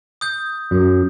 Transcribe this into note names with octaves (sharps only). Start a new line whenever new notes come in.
D#6 G6
F#2